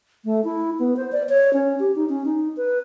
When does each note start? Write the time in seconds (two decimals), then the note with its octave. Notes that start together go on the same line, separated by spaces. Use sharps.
0.25 A3
0.44 E4
0.79 B3
0.97 C5
1.12 D5
1.29 C#5
1.53 C#4
1.80 G4
1.96 D#4
2.09 C#4
2.25 D#4
2.57 B4